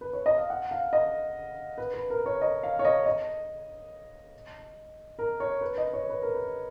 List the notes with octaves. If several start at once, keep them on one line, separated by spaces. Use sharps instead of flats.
B4
C#5
D#5
F5
F#5
F5
D#5
B4
B4
A#4
C#5
D#5
F5
C#5
D#5
D#5
A#4
C#5
B4
D#5
C#5
B4
A#4
B4